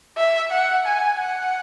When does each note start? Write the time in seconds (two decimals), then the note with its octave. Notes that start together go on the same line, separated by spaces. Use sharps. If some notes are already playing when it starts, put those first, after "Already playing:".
0.17 E5
0.52 F#5
0.86 G#5
1.20 F#5